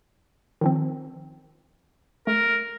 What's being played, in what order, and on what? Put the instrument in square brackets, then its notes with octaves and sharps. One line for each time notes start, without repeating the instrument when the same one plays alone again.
[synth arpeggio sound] D#3 F3 C4
[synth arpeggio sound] A3 [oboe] A#4